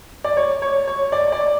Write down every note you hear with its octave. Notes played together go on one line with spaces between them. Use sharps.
D5
C#5
C#5
C#5
D5
D5